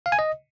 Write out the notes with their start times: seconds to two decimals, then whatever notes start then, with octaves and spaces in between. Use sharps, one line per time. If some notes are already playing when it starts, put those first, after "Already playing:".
0.06 F5
0.12 G#5
0.19 D#5